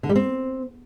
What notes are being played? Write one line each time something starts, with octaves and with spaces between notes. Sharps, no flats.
D3
G3
C4